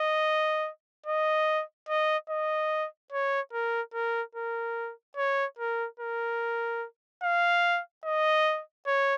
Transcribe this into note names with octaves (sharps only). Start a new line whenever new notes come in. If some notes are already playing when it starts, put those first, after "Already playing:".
Already playing: D#5
D#5
D#5
D#5
C#5
A#4
A#4
A#4
C#5
A#4
A#4
F5
D#5
C#5